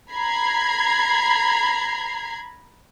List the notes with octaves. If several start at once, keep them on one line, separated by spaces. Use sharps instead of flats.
A#5 B5 G#6 C7